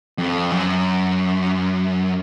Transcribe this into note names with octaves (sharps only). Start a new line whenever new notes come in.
F2
F#2